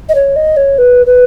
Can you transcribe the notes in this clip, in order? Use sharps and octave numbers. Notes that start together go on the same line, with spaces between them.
D#5
C#5
D#5
C#5
B4
B4